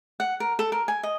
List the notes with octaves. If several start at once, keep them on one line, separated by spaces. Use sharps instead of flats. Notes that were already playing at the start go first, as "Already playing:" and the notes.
F#5
A#4
A4
A#4
G#5
D#5